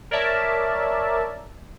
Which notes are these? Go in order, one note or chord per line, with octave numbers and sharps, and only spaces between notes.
A#4 C#5 D5 E5 A5